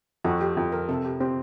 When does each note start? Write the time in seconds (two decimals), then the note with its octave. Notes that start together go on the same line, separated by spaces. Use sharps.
0.25 F2 F#4
0.41 G4
0.57 F2
0.72 A#4
0.89 C3 A4
1.05 G4
1.20 C4 G4